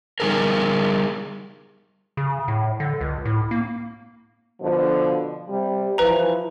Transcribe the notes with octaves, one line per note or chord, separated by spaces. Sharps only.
G3 D#4 G#4 A#4
C#3
A2
D3
C#2
A2
A#3
B2 D3 F3
C3 G3
E3 F3 B4 A#5